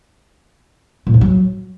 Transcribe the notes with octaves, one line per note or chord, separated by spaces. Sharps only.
A#2
F#2
F#3